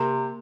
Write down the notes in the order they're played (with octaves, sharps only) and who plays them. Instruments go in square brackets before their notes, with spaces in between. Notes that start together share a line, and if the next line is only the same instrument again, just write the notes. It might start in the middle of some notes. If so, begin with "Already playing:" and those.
Already playing: [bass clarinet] C3 [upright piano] A#3